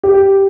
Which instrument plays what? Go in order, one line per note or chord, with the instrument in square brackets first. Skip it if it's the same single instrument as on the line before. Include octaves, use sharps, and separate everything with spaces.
[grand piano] G4